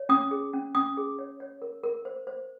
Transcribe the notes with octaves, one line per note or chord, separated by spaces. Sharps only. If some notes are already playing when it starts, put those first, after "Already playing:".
Already playing: C#5
C#4 D#6
G#4
C#4
C#4 D#6
G#4
C#5
C#5
A#4
A#4
C5
C5